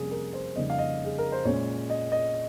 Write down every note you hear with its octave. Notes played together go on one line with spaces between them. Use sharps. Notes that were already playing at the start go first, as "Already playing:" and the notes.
Already playing: F2 C3 G3 A#3 C#4 G#4
A#4
C5
F2 C#3 G3 A#3 D#4 D#5
F5
D#5
G#4
A#4
C5
A#2 G#3 C#4 C#5
D#5
D#5